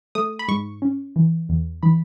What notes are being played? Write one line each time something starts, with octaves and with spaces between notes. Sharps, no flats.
A3 D#6
B5
G#2 C#6
C#4
E3
E2
E3 B5